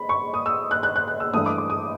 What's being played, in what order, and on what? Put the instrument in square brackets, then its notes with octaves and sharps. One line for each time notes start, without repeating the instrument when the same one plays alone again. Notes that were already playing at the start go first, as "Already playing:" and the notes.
Already playing: [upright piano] B5
C#6
D#6
E6
F#6
F#6
F#6
F#6
E6
G2 E3 A3 D#6
D6
D6
D#6